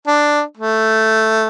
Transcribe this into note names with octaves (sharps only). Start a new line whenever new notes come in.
D4
A3